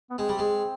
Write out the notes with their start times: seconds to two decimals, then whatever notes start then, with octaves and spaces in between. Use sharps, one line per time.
0.11 B3
0.18 G#3 C4
0.29 G3
0.39 G#3